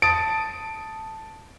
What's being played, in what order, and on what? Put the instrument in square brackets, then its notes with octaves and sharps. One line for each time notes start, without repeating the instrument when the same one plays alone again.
[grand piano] A5 D#6 A6 D7